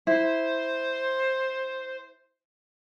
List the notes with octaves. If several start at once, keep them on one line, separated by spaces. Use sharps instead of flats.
E4 C5